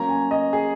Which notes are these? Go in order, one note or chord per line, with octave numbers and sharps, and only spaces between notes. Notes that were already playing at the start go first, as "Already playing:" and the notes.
Already playing: F#3 A#3 C#4 A#5
G#5
D#5
G#4